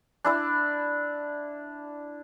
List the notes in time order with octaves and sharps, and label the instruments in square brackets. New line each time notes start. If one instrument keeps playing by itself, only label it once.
[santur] D4 E4 D5